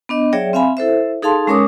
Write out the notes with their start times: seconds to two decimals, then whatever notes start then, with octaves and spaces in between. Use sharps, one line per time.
0.09 B3 D4 D#5
0.33 F#3 G#4 C#5 D5 E5 G5
0.53 C4 E5 F5 G#5 B5
0.77 E4 A4 C5 E5
1.22 D#4 G#4 A4 F5 A5 C6
1.47 G#3 C#4 A#4 C#5 D6 D#6